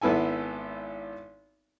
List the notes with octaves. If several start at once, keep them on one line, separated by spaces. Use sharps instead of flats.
G#1 B3 E4 A4 G#5